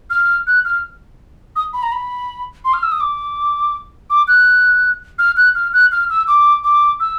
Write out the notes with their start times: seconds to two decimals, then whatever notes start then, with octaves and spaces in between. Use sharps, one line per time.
0.10 F6
0.47 F#6
0.65 F6
1.56 D#6
1.73 B5
1.83 A#5
1.92 B5
2.65 C6
2.73 F6
2.83 E6
2.92 D#6
3.01 D6
4.10 D6
4.28 F#6
5.19 F6
5.37 F#6
5.55 F6
5.73 F#6
5.92 F6
6.10 E6
6.28 D6
6.64 D6
7.00 E6